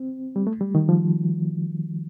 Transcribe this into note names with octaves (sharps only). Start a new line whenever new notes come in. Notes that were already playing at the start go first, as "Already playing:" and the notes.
Already playing: C4
G3
A3
G3
D#3
F3